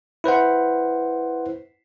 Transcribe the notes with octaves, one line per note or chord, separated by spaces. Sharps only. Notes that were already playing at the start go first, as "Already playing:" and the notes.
E4 B4 C5 F#5